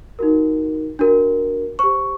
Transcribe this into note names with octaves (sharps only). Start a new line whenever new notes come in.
D#4 F#4 A#4
D4 F#4 A#4
G4 C5 C#6